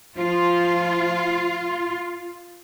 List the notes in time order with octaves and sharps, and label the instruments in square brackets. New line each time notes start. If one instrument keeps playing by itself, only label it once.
[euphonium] F3 [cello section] F4